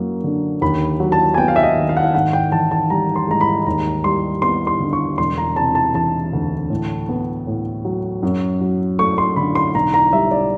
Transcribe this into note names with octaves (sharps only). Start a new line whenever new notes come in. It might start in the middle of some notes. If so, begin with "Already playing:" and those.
Already playing: F#2 F#3 A#3
D3
D#2 B5
F#3
A5
G#5
B3 G5
F5
E5
D#5
D#3
F5
F#5
F5
G#1 F#5
G5
E3 A5
A5
G3 A#5
C6
G#2 A#5
B5
D#2 A#5
G3 C6
B3 C6
C6
D3
C#6
E1 C6
A#5
C3 A5
A5
E3 A5
D2
A2
B3
A2
F#3
F#2
F#3
A3 C#6
C6
D3 B5
C6
B1 A#5
A#5
G3 E5
D5